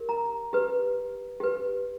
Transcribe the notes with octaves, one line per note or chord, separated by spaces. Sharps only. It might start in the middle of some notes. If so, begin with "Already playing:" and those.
Already playing: G4 A#4
A#5
G4 B4
G4 B4